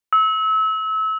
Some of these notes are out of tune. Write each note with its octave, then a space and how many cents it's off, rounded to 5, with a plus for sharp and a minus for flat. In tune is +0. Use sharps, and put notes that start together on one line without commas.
E6 -30